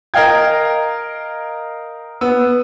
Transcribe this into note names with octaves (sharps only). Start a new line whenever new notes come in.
A#4 D#5 F5 G5 G#6
B3 E6